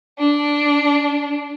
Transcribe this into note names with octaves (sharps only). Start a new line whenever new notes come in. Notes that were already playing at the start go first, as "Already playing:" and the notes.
D4